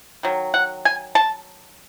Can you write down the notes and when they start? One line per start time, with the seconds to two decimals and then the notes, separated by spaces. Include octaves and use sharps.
0.23 D#3 F#3
0.54 F#5
0.85 G#5
1.15 A5